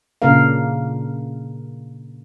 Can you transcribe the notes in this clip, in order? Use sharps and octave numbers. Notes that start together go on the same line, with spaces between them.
A#2 C#3 A#3 D4 A#4 F5